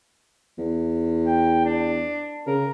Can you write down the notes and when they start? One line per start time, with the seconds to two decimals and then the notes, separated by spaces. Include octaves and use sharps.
0.58 E2
1.26 G5
1.65 D4
2.47 C#3 A#4